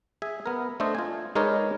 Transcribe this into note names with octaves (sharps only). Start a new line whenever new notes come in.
G#4 E5 G#5
B3 A#4
A3 D4 A4 C5 D#5
F4 G#5
G#3 D#4 A#4 B4 C#5 D5